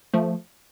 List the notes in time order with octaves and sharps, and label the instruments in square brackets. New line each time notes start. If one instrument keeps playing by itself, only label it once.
[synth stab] F3 A3